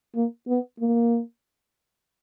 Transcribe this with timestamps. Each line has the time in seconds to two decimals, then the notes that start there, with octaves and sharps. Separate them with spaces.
0.15 A#3
0.48 B3
0.80 A#3